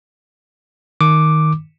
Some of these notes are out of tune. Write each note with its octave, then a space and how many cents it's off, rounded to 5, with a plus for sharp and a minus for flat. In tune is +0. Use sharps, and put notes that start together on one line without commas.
D#3 +0 D6 +0